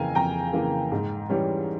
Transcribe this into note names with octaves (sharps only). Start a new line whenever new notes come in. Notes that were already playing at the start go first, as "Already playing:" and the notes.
Already playing: F2 C#3 E3 A#3 F5 G5 G#5 A#5
F2 G5 A#5
C#3 E3 A#3
G#2
E3 G3 C#4